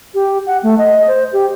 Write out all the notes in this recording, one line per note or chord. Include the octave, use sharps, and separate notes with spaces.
G4
F#5
A3
D#5
C5
G4